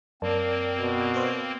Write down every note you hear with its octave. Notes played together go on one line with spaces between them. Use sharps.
F#2 A#3 C4 A#4 D5 A5
B2
B4 C5 C6